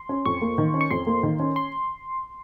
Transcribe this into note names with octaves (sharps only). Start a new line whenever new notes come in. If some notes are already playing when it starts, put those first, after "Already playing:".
Already playing: C6
C#4
F2 C#6
A#3
D#3
C#4
C#6
F2 C6
A#3
D#3
C#4
C6